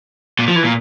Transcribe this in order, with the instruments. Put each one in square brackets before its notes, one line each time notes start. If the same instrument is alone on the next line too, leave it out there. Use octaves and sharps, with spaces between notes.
[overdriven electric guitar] A#2
F3
E3
A#2